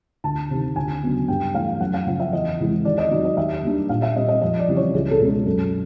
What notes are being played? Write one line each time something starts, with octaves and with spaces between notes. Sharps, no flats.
D2 A5
C3 D#3
D2 G#5
C#3 F#3 B3 D4
G2 G5
E3 A3 F5
F#2 F#5
F5
C#3 F3 F#5
E5
E2 D#5
C3 E3 G#3 C4
D#2 D5
D#5
D#3 F#3 D5
D#5
D#2 E5
D#3 G3 A#3 D4
A#2 F5
E5
G3 C4 D#5
D#5
F2 D#5
D5
C#3 E3 G3 C4
C#5
C#2 G#4
A4
B2 G#3 C#4
A4
F#2 A4